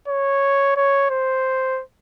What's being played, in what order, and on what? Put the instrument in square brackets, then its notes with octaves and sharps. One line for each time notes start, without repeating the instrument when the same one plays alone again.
[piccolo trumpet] C#5
C#5
C5